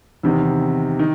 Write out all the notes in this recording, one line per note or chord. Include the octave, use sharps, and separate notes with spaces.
E2 C3 D#3
D#3